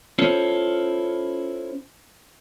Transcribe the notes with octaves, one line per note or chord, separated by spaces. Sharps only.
C#4 E4 F4 A4 C5 C#5